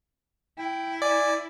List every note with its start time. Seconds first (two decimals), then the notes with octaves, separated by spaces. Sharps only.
0.58 E4 G5
1.02 D5 G#5